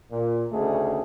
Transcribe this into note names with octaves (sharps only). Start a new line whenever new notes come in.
A#2
D2 C#3 A3 C#4 D#4 G#4